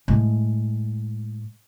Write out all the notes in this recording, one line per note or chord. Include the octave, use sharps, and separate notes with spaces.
A2 G#3